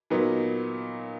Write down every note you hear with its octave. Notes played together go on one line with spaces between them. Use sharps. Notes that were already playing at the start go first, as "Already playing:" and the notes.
A#2 F#3 B3 D#4